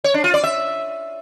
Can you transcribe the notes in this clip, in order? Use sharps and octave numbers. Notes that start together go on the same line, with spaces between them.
C#5
D4
F4
D5
E5